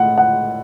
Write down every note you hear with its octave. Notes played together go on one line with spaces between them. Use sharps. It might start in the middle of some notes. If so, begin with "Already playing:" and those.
Already playing: A2 F#5
F#5